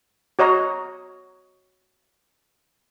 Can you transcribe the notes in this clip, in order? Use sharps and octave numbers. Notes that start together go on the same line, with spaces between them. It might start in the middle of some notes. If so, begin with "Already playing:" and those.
F#4 C#5 D#5 A#5